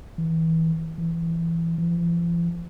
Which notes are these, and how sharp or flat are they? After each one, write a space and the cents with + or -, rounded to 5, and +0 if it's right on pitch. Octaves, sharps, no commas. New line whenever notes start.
E3 -25
E3 +15
F3 -45